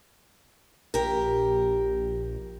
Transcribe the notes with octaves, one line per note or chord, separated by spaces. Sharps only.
A#1 G4 A#4